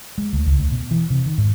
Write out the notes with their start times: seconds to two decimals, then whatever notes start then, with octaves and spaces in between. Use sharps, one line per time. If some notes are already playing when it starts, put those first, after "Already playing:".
0.18 G#3
0.33 D2
0.46 C#2
0.59 D2
0.72 B2
0.91 E3
1.10 C3
1.26 D#3
1.38 G#2